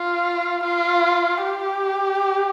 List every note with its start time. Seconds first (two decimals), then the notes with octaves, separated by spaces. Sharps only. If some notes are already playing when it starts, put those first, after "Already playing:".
Already playing: F4
0.63 F4
1.44 G4